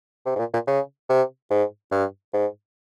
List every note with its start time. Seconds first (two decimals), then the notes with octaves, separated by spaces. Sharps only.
0.26 C3
0.36 G#2
0.40 A#2
0.54 A#2
0.68 C#3
1.10 C3
1.51 G#2
1.92 G2
2.34 G#2